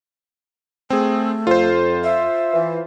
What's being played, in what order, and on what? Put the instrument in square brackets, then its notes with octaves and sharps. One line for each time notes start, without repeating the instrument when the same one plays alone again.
[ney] A3 [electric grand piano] C4 G#4
[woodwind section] F2 [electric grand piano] F4 C5
[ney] E5
[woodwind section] E3